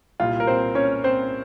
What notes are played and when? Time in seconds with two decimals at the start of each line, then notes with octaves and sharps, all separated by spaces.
0.20 C2 A#2 G3 F4
0.40 A#4
0.47 C4 C5
0.75 C#4 C#5
1.04 C4 C5